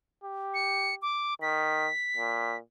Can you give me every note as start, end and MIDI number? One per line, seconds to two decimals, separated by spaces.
0.24 1.00 67
0.54 0.95 97
1.02 1.34 86
1.42 1.88 51
1.42 2.57 95
2.17 2.58 46